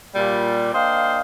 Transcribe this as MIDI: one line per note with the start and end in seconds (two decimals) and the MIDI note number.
0.15 0.69 46
0.15 0.69 55
0.72 1.21 58
0.72 1.21 62
0.72 1.21 72
0.72 1.21 75
0.72 1.21 77
0.72 1.21 79